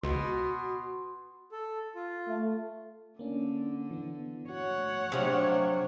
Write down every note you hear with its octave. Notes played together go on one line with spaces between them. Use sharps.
C#2 B2 F#4 C6
A4
F4
A3
D3 A#3 C#4 D4
E3 B3
F#4 C#5 F#5
C3 F3 F#3 D4